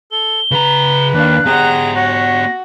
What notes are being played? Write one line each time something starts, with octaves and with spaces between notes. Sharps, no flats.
A4 G7
C#3 B4 A#5
D#2 D4 F5 F#6
B3 G4 G#4 F#5 A#5
F#4 C#5 F#5 A#6